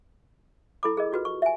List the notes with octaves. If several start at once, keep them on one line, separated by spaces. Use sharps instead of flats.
E4 A4 B5 D6
G#4 A#4 D#5
F4 F#4 B4
C#6
E5 G#5